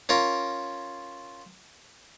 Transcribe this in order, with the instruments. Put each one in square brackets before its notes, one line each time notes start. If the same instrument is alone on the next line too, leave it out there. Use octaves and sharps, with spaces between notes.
[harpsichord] C#4 F4 A#4